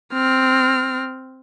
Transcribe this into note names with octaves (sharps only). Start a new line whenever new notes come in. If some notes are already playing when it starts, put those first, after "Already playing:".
C4 F6